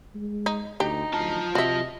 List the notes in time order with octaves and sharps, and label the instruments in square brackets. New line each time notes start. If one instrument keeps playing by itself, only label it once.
[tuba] G#3
[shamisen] D#4
[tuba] D2 [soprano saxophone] D#4 [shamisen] G4
[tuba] D2 [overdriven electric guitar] F4 A5
[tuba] C3 [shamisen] F#4 E5 [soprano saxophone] D#5